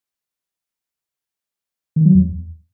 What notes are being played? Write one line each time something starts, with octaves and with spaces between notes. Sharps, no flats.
D#3
F#3
E2